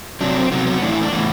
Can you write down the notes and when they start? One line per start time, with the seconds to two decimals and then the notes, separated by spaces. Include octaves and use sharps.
0.21 C3 F#3 D4
0.36 C4
0.51 C3 F#3 B3
0.66 B3
0.82 A2 E3 D4
0.92 E4
1.03 D4
1.12 A2 E3 B3